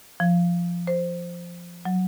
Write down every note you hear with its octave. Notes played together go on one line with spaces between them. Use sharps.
F3
C5
F#3